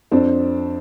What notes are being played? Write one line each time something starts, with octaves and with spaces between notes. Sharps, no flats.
F2 C4 D4